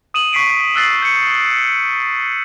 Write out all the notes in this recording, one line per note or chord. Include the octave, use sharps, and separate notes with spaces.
D#6 D#7 E7 F#7
C#6 B6 C7 D7 D#7
E6 F#6 A6 C7 E7 F#7
G6 C#7